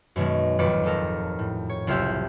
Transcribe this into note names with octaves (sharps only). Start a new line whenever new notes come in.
F#2 B2 D#3 G#3
D#1 G#1 F2 B4 D6 C#7
G#1 A4 A#4
A2
C#5
F#1 C2 F4 G4 E5 G6